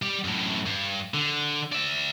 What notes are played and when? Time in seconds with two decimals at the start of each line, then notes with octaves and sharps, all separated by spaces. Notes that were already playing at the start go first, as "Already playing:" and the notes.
0.02 G3 G4
0.24 F#2 A2
0.66 G2
1.14 D3
1.72 D5 E5